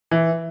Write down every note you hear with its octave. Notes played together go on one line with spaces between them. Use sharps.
E3